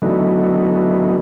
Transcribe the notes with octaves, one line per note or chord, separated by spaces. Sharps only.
D3 E3 F#3 A3 B3 D#4